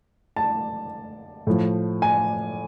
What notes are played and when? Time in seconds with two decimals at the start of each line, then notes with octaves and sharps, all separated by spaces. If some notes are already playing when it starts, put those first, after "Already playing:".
0.36 A5
1.47 A2 F3
2.02 G#5